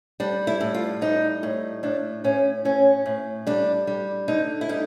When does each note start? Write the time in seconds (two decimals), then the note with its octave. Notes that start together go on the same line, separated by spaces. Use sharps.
0.20 G3 D4
0.47 E4
0.61 A2
0.75 F4
1.01 G3 D#4
1.43 A2
1.83 A2 D4
2.24 A2 C#4
2.65 A2 C#4
3.06 A2
3.47 G3 D4
3.87 G3
4.28 D3 D#4
4.61 E4
4.69 G3 D#4